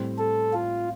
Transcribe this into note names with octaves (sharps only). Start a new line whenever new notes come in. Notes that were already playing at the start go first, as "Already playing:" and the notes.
Already playing: A2 G3 C4
A4
F4